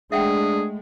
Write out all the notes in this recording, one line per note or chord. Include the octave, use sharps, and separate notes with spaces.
G#3 A3 D4 G#4 E5 F#5 G5